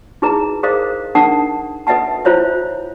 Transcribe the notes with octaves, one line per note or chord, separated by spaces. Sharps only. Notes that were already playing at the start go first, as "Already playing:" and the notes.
D#4 E4 G#4 B4 D#5 A#5
G#4 A#4 C5 D#5 F5 D6
D4 D#4 A#4 F#5 A5
A4 B4 D#5 E5 F#5 A5
E4 F4 C5 C#5 E5